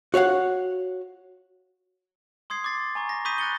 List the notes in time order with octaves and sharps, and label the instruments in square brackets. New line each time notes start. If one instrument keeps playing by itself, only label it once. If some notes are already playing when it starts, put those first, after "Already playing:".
[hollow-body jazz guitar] F#4 C#5 F5 F#5
[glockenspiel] C6 D#6 G#6 C7
D6 A6 C7
G#5 A#5 C#6 G#6
A#6
B5 C#6 D#6 G6 B6 D#7
F#6 A6 C#7 G7